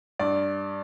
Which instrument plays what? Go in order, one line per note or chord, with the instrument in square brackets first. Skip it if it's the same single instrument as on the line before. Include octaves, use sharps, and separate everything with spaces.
[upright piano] G2 D5